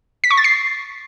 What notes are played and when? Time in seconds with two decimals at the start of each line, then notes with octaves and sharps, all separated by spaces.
0.24 B6
0.31 C#6
0.37 A6
0.44 C7